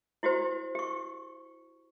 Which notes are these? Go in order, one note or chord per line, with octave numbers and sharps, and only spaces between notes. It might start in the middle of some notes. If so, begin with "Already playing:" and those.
E4 F#4 G4 C5
G4 C#6